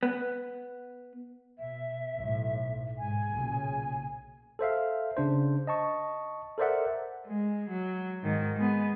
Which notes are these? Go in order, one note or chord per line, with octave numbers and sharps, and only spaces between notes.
B3
B2 E5
B1 A2
G#2 G#5
B1 A#2 C#3
A4 C5 E5 F5
C#3 D4 C5
D#5 A5 C#6
A4 A#4 C5 D5 E5 F#5
G#3
F#3
G#2 D#3
G#3 B3